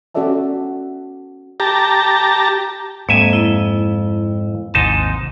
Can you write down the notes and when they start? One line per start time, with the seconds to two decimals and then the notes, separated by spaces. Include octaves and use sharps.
0.14 C#4 F#4 A4 D5 E5 A5
1.60 G4 A5 A#5
3.09 F2 G#2 A#3 E5 G#5
3.33 E4
4.74 G#1 D#2 G#2 C3 D#4 A5